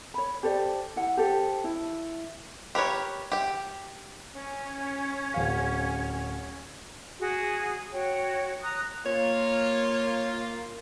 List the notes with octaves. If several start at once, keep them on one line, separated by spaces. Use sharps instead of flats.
C#5 B5
G4 A4 C5 D5
E4 F#5
G4 A4 C5
E4
G4 A#4 B4 C#5
G4 G5
C#4
D1 F5
F#4 G#4
F#4 C#5 G5
A#5 D#6 F#6
A#3 F4 C#5